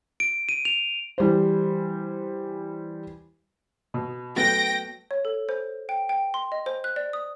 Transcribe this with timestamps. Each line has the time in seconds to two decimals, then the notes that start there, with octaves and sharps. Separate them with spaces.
0.20 D7
0.49 D#7
0.65 F7
1.18 E3 G3 C5
3.94 B2
4.36 F#3 A3 B3 G5 A#6 D7
5.11 C#5
5.25 A4
5.49 C5
5.89 G5
6.09 G5
6.34 C6
6.52 D#5
6.66 C5
6.84 F#6
6.96 D5
7.13 D#6